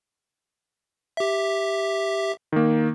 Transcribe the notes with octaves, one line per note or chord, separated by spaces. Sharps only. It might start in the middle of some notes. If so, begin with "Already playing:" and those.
G4 E5
D#3 A#3